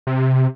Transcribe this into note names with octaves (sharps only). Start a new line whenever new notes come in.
C3